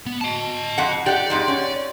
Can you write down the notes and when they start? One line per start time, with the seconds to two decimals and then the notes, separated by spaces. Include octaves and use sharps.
0.06 B3
0.21 D#5 A5
0.78 F2 F#5
1.06 G4 D5 F#5
1.30 F2 G#2 G#3
1.48 C#4